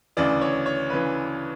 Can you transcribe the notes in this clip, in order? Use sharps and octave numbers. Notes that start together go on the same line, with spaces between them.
D2 C#3 E3 D5
C#5
C#5
C#3 E3 B4